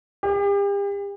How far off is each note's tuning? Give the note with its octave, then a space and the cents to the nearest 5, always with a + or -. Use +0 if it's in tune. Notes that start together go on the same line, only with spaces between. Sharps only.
G4 +40